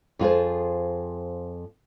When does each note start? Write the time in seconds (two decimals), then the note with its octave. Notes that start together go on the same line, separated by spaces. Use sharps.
0.19 F2 F4 G#4 C5